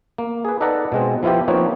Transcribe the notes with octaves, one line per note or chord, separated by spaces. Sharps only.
A#3
G#4 B4
D#4 A4 B4 D5 F#5 A#5
B2 G#3 C4
F3 B3 E4 F4 G4
F3 A#3 C4 D#4 B4 C#5